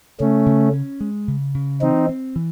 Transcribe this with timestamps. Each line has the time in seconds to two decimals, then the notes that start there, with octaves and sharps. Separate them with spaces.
0.20 C#3 A3 C#4
0.46 C#3
0.73 C#4
1.01 G#3
1.28 C#3
1.55 C#3
1.81 E3 C4 D#4
2.09 C4
2.36 E3